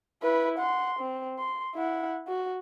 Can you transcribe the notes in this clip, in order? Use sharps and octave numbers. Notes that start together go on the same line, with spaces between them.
E4 B4
F#5 C6
C4
C6
E4 F#5
F#4